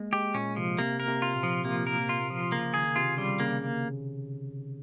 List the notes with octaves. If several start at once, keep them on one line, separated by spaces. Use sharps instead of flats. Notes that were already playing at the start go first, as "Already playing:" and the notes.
Already playing: G#3 A#3
G#3 G4
A#2 C#4
C3 F3
C3 A#3
A#4
C3
F4
A#2
F3
C3 A#3
A#4
F4
F3
C#3 A#3
D#3 G#4
C3 F4
C#3 G3
C#3 A#3